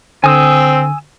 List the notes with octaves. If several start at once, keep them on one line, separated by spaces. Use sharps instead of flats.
D3 C4 G#5 D#6 E6